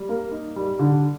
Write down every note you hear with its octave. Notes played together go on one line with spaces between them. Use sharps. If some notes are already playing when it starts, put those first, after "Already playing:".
Already playing: G3
A#3
D#4
G3
D3